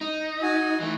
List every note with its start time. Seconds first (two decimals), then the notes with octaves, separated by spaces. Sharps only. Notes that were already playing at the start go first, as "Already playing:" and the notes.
0.01 D#4
0.43 F#4 G#5
0.80 E3 A3